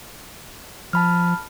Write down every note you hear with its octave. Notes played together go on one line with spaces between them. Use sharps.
F3 A5 B5 F6